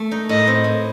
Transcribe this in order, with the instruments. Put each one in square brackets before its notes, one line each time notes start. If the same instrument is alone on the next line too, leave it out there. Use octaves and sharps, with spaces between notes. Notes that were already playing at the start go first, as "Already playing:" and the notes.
Already playing: [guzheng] A3
D#4
[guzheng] A2 [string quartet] D#5
[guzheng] C4
A2